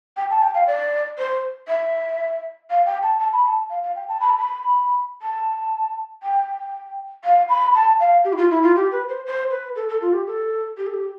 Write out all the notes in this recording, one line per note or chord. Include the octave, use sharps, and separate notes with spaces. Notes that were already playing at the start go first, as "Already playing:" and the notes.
G5
A5
G5
F5
D5
C5
E5
F5
G5
A5
A5
B5
A5
F5
F5
G5
A5
B5
A5
B5
A5
G5
F5
B5
A5
F5
G4
E4
F4
E4
F4
G4
B4
C5
C5
B4
A4
A4
F4
G4
A4
G4
A4
G4